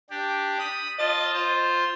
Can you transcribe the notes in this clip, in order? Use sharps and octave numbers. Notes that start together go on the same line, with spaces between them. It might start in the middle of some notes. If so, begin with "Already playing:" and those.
D4 G4
B5 D#6
F4 D#5 A5 A6
F4 C5